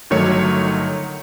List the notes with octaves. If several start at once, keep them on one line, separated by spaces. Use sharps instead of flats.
G1 D#3 F#3 A3 C#5 C#7